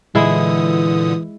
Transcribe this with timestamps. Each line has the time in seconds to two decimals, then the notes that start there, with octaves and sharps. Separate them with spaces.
0.15 A#2 D3 E3 G#3 E4 D#6